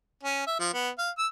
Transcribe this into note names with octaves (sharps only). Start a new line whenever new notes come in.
C#4
E5
F3
B3
F5
E6